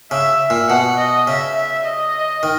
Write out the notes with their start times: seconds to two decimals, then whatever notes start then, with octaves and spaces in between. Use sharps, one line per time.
0.11 C#3 E5
0.50 A#2
0.69 B2 F#5
0.98 D#5
1.27 C#3 E5
1.56 E5
1.86 D#5
2.43 D#3